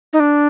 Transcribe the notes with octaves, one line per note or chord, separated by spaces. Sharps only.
D#4
D4